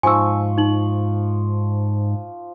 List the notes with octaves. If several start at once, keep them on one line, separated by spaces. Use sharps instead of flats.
G#2 F3 G#5 C#6 E6
D#4 F#7